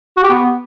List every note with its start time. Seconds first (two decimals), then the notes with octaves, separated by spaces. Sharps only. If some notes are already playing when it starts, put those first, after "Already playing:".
0.17 F#4
0.23 G4
0.30 B3